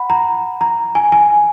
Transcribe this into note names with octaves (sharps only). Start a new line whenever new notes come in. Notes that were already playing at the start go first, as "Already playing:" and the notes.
Already playing: F#5 B5
A#5
A#5
G#5
G#5